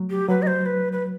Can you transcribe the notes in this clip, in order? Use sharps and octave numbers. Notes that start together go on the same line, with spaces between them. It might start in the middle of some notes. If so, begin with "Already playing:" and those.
Already playing: F#3 A3
G4
F#3 B4
D#5
C5
B4
B4